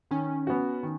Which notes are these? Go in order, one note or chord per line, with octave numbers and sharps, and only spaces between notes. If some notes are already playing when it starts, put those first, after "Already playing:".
D#3 C#4
B3 F#4
D#3